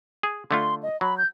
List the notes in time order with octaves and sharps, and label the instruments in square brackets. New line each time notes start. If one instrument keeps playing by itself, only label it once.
[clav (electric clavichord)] G#4
[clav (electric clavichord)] D3 A3 F4 [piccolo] C6
[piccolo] D#5
[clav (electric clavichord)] F#3 [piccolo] B5
[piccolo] G6